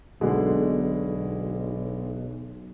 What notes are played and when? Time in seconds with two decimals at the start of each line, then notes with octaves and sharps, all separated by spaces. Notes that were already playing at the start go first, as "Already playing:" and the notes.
0.21 B1 B2 D3 G#3